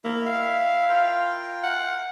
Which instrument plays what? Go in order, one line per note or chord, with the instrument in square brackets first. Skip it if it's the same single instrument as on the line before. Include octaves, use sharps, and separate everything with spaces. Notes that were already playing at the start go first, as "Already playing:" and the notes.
[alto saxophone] A#3 [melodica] E4 E5
[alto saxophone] F5
[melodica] F4 A#4 G5
[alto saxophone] F#5